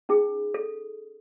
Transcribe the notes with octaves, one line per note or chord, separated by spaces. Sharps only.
C#4 D#4 G#4
A4